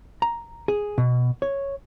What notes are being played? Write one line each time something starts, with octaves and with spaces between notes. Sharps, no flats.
A#5
G#4
B2
C#5